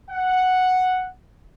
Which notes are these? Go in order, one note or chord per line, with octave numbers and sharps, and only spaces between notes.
F#5